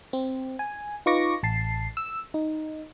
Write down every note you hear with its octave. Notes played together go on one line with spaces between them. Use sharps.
C4
G#5
D#4 F4 B4 C#6 D6 A#6
A1 A5 C7
E6
D#4